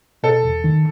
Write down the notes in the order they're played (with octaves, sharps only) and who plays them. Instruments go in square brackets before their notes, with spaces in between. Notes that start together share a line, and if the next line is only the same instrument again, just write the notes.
[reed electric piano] B2 [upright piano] A4
[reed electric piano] E2
D#3